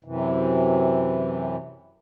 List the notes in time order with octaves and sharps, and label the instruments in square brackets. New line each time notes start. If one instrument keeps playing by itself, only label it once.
[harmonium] F#2 C3 E3